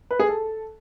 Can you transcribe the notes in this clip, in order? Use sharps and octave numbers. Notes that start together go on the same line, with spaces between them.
B4
G#4
A4